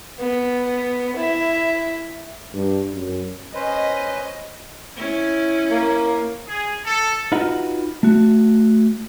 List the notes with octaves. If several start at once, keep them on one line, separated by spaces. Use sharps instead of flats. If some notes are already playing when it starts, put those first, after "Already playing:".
B3
E4 E5
G2
F#2
C#4 B4 C5 D#5
C#4 E4
A#3
G#4
A4
D#4 F4 F#4 B4 D#5 F#5
A3 F#4